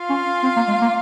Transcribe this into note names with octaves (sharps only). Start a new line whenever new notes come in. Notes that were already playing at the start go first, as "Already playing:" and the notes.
Already playing: F4 F5
C#4
C4
A#3
G#3
A#3